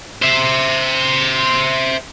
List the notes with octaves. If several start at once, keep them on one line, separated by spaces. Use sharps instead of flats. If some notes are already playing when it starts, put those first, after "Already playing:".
C5 E5